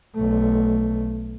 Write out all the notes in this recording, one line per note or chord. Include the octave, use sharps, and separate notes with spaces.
B1 A3